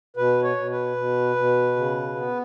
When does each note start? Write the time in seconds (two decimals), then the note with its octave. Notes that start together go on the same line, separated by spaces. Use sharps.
0.17 B2 B4
0.43 C#5
0.56 B2
0.71 B4
0.97 B2
1.36 B2
1.76 C#3
2.15 B3